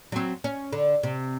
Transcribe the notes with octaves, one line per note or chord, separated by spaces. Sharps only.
F#3 C4
C#4
D3
C3